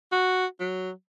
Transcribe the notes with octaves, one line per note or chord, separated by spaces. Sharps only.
F#4
F#3